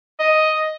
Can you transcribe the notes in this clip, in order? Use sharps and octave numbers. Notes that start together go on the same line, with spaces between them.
D#5